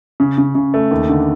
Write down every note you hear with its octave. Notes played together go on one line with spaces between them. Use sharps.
C#3
C#3
C#3
A3
D#2
D3